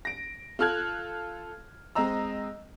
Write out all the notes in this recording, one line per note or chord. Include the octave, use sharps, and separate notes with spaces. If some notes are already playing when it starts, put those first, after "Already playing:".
A#6 D7
F4 A4 F6 F#6 G#6
G#3 C4 D#5 A#5 E6